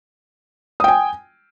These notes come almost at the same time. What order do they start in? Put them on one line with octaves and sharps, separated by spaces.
D#6 G5 G#5